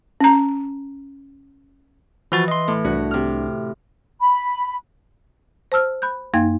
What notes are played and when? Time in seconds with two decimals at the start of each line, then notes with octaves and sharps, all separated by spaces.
0.21 C#4 A#5
2.32 E3 F3 F#4 A6
2.48 D#5 C6
2.68 A2
2.85 C2 D4 F#4
3.11 C3 F6
4.21 B5
5.72 C5 A5 E6 F6
6.02 B5 F#6 G6
6.34 F#2 A#3 D#4 F5 G#6